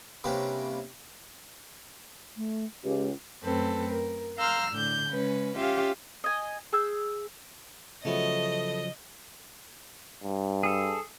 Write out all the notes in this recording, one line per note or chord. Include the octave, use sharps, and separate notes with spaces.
C3 G3 A#3 C#4 D4 B4
A3
C#2 G4
F#2 A3 C4 A4 B4
A#4
F5 A#5 C6 E6 F6 G6
A2 D3 D4 G6
C#3 G#3 C#4 B4
C#4 F4 G4 E5 F5
D#5 G#5
G#4 E6 G6
C#3 F3 F#3 A3 B3 D#5
G2
G#4 A4